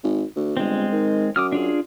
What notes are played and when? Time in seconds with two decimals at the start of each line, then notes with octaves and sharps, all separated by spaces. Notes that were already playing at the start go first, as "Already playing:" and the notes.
0.04 G#1
0.36 D2
0.57 G1 G#3 C4
0.92 D#3
1.36 F#2 D6 D#6 F6
1.52 D4 F4 G#4